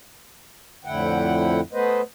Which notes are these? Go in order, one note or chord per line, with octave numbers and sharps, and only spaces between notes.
F2 A2 D3 E4 F#5 G5
A3 B3 B4 C5 D#5